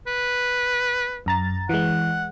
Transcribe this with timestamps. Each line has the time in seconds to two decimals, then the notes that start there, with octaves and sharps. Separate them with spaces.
0.07 B4
1.26 F#2 A#5 A6
1.69 E3 G#3 F#5